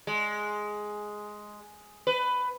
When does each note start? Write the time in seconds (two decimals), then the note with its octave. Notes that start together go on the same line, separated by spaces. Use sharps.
0.07 G#3
2.07 B4